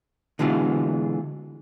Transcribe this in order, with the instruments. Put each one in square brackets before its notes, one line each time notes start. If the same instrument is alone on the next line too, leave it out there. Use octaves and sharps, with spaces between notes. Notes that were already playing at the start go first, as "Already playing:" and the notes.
[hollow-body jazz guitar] B2 D3 E3 G#3 F4